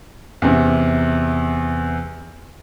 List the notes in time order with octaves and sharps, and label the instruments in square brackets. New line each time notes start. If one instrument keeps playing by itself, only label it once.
[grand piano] E2 C3